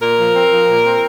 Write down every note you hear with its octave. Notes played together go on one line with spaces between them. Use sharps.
A#2 A#4
F3
C4
F3
A#2
C4